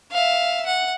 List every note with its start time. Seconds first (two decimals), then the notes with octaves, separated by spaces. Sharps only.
0.12 E5 F5
0.66 F#5